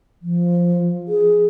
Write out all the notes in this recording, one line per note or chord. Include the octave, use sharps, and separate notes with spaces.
F3
G#4